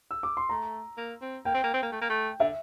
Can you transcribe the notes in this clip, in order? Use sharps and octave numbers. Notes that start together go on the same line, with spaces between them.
E6
D6
C6
A3 A#5
A#3
C4
A#3 G5
C4
A#3
C4
A#3
A3
A#3
A3
D3 E5